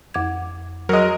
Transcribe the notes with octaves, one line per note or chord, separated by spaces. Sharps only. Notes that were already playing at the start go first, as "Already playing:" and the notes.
F2 D6 G#6
F#3 G#3 A#4 D#5